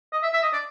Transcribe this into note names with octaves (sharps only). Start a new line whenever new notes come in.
D#5
E5
E5
D#5
D5